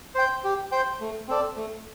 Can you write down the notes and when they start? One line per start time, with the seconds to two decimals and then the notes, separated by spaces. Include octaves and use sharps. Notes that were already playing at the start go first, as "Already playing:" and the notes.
0.15 C5 G5
0.44 G4
0.72 C5 G5
1.00 A3
1.28 C4 A4 D5
1.56 A3